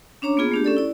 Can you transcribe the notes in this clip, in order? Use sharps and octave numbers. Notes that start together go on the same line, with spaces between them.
C#4 D4 C#5 A#5 D6
A#3 B3 F4 G#4
A3 D4 G4
C#4 A4 D5
E4 D5